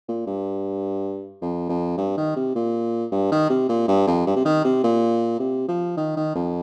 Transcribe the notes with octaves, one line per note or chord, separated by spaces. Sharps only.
A#2
G2
F2
F2
G2
D#3
C3
A#2
G2
D#3
C3
A#2
G2
F2
G2
C3
D#3
C3
A#2
C3
F3
D#3
D#3
F2